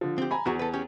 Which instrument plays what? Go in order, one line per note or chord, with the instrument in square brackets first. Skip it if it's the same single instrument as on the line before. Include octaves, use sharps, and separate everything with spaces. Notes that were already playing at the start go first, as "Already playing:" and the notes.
[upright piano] D3 F3
[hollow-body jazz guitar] C4 G4
[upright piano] G#5 A#5 B5
[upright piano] E2 [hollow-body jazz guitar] E3 F#4 G#4
[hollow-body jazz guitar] A4 B4
C#4 G4